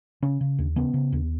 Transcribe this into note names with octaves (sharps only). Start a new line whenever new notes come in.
C#3 C#4
C#3
D#2
C#3 B3
C#3
D#2